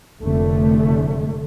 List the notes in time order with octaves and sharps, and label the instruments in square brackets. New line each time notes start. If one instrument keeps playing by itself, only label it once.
[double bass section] F1 F2 D3 A3